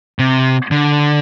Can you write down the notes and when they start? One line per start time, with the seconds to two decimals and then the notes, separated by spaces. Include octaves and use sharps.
0.19 C3
0.71 D3